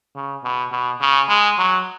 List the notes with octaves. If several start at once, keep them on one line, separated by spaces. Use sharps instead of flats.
C#3
B2
B2
C#3
G#3
F#3